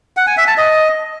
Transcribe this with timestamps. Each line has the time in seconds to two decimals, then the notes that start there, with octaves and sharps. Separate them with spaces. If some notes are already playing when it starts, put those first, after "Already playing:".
0.17 F#5
0.27 G#5
0.37 E5
0.47 A5
0.58 D#5